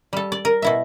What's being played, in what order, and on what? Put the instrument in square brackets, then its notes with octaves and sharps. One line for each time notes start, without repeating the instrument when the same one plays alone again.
[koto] G3 A4
D5
A#4
B2 E4 E5